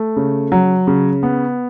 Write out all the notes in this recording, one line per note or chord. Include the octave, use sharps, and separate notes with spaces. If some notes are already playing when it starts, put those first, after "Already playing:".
Already playing: A3
C#3
F#3
C#3
B3